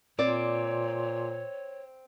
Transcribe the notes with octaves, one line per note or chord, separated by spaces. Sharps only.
A#2 C4 C#5 D5